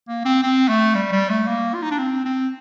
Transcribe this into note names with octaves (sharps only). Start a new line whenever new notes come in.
A#3
C4
C4
A3
G3
G3
A3
A#3
F4
D#4
D4
C4
C4